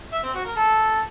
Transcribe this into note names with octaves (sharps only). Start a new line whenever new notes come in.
E5
C4
F#4
A#4
A4